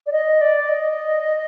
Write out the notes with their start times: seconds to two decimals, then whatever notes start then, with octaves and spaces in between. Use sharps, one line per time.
0.07 D5
0.12 D#5
0.41 D5
0.69 D#5